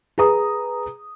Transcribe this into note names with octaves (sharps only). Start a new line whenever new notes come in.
G#4 B4 A#5 D#6